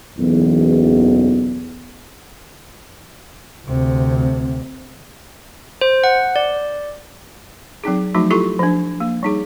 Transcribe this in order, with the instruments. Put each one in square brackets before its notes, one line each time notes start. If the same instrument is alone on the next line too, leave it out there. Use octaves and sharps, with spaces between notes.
[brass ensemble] F#1 B1 E2
[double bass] D2 C3
[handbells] C5
F#5
D5
[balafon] F#3 C4 D#4 G#4
F3 F#3 A3 D#4 F#4
E4 F4 G4 A4 C#6
F3 D4
A#3
G3 D#4 G#4